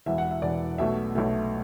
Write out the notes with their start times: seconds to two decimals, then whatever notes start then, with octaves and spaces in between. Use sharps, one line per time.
0.06 E1 E2 E3 E5
0.18 F#5
0.31 E5
0.42 E1 E2 E3 D5
0.78 B1 B2 A3 E5
1.15 B1 B2 A3